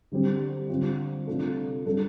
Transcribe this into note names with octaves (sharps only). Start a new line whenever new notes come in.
D3 G3 C4 G4
D3 G3 C4 F4
C3 A3 D4 F4 A4
G3 D4 A4